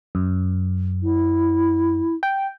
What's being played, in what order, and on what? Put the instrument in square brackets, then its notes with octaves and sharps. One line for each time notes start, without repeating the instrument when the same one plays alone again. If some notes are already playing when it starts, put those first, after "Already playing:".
[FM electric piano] F#2
[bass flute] E4
[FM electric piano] G5